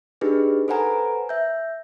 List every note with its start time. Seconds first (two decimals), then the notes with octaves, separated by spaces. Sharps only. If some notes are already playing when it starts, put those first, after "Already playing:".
0.21 D4 D#4 G4 G#4 B4
0.68 A4 B4 C5 F#5 G#5 A#5
1.29 E5 G6